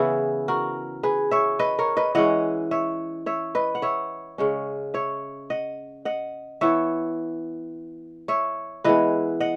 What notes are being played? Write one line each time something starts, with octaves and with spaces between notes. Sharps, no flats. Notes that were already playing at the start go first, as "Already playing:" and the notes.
Already playing: C#3 E3 B3 E4 G#4
F#4 A#4
G#4 B4
C#5 E5
B4 D#5
A#4 C#5
B4 D#5
E3 G#3 C#4 D#5 F#5
C#5 E5
C#5 E5
B4 D#5
F#5
C#5 E5
C#3 G#3 C#4
C#5 E5
D#5 F#5
D#5 F#5
E3 B3 C#5 E5
C#5 E5
E3 G#3 B3 B4 D#5
D#5 F#5